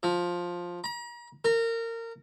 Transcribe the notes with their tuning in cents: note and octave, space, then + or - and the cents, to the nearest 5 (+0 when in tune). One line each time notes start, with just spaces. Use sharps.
F3 +10
A#5 +40
A#4 -25